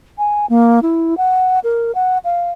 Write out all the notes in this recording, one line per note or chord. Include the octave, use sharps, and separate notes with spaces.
G#5
A#3
E4
F#5
A#4
F#5
F5